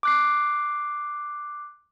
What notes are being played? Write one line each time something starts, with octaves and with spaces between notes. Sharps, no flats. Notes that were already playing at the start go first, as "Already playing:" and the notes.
D6 F#6 C7